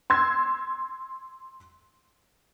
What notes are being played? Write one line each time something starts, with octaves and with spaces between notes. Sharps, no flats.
C6 E6 G#6